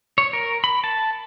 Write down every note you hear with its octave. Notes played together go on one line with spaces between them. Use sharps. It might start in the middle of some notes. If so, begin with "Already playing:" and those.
C#5
A#4
B5
A5